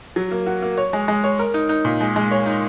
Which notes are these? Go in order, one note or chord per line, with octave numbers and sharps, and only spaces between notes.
F#3
A#3
F#4
A#3
C#5
G#3
G#3
C#5
A#4
D#4
D#4
A#2
G#3
G#3
C#5
D#4